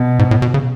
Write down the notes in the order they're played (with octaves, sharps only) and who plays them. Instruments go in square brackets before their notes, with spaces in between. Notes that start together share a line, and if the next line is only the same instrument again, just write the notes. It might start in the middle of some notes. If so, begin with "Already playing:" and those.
Already playing: [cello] B2
[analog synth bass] G#2
A2
B2
C#3